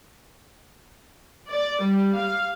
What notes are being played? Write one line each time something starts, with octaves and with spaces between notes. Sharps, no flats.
D5
G3
F5